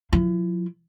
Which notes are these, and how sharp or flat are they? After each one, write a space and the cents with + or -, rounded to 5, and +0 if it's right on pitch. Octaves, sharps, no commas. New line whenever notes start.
F3 +45 E4 +35